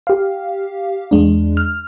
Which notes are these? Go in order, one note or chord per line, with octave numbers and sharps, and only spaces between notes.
G4 F5
E2 G#3 D4
F6